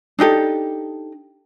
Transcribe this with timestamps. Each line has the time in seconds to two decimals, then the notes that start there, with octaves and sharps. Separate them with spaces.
0.19 D4 D#4 G4 A4